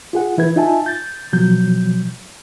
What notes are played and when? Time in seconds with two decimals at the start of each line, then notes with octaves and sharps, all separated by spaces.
0.13 F4 G#4 F#5
0.37 E3 E4 B4 G#6
0.56 D#4 F4 E5 G#5 A5
0.86 G6 A6
1.33 B2 F3 F#3 G6